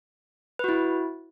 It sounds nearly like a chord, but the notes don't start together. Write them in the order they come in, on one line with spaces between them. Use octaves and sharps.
B4 F#4 E4